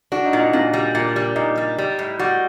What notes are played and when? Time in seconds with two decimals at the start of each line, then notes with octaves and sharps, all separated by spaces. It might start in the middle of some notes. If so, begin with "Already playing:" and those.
0.12 D4 F#4
0.26 D#4
0.33 A#2
0.40 D#4
0.53 A#2 D4
0.73 G3
0.95 A#2
1.16 G3
1.36 A#2 D#4
1.57 G3
1.78 G3
1.99 A2
2.19 G3 F#4